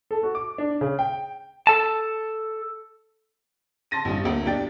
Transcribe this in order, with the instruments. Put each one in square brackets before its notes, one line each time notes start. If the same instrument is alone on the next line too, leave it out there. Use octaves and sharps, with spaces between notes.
[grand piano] A4
F#4
D6
D4
C#3
G5
[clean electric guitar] A4 A5
[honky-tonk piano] A5 C6 A6 A#6 D#7
A1 G2
D2 A#3
B1 D4 G4 G5 A6